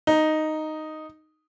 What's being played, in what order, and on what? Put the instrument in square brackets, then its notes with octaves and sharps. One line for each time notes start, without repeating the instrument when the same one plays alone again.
[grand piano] D#4